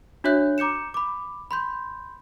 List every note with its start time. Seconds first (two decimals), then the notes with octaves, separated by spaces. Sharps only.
0.24 D4 F#4 C#5 E5 F#6 G6
0.58 A#5 D6 G6 C#7 E7
0.94 B5 D6
1.51 B5 C6 G6